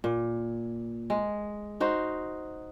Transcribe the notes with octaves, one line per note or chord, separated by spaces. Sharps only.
A#2
G#3
D#4 F#4 C5